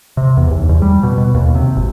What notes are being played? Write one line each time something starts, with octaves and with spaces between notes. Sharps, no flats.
C3
E2
D#2
E2
G3
B2
B2
D#2
C3
G#1